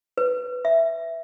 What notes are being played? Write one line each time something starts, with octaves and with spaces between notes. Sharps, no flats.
B4
E5